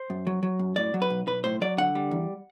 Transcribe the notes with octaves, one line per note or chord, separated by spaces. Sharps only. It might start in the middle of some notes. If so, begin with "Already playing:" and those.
Already playing: C5
F#2
F#3
F#3
F#2
A2 D5
F#3
B4
B1
B1 B4
A2 C5
F#3 D5
D3 F#5
G3
E2